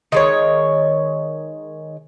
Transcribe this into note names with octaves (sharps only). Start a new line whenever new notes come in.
D#3 G#3 C#5